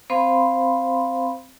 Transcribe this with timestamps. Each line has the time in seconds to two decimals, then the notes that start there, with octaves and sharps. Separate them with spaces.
0.10 C4 C5 F5 B5 C6